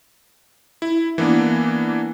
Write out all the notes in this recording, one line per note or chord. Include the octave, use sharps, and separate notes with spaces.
E4
E3 A#3 B3 D4